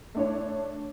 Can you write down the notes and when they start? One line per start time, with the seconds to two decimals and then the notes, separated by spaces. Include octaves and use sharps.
0.15 A3 D4 C#5